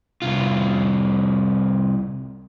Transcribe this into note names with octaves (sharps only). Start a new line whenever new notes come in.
C2 F4